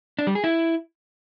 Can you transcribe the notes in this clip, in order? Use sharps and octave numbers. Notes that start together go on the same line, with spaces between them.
D4
G3
G#4
E4